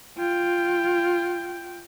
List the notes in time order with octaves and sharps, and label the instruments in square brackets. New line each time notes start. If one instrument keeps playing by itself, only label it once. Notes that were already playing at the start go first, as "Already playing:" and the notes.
[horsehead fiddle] F4 G5